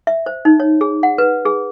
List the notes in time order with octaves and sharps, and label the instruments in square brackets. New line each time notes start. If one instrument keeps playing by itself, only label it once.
[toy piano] E5
C5
D#4
C#5
G#4
F#5
B4
G#4